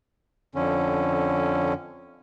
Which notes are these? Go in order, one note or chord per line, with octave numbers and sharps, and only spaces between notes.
F2 D3 C#4